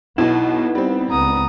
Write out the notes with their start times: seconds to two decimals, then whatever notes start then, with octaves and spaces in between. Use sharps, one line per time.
0.18 B1 B2 B3 D#4 E4
0.75 G3 C4
1.10 C#2 B3 A#5 D#6